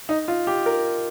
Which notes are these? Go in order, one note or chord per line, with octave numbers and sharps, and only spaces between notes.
D#4
F4
G4
A#4